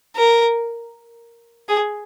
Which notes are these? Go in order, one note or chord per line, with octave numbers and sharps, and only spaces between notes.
A#4
G#4